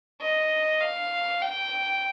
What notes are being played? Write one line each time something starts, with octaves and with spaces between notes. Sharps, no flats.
D#5
F5
G5